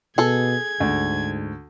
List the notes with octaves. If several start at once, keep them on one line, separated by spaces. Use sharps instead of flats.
B2 G#4 A4 G#6
D2 G#2